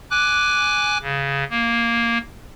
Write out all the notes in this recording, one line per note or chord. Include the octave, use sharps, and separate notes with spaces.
G#5 D6 F#6
C#3
A#3